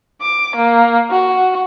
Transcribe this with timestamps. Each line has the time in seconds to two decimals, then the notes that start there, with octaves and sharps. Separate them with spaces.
0.21 D6
0.56 A#3
1.11 F#4